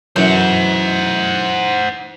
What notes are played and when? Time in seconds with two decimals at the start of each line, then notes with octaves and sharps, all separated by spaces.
0.16 F#2 E3 E4 B4 C5 F#5